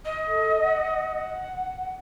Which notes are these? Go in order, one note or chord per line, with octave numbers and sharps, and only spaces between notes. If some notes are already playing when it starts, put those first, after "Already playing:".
D#5
A4
F#5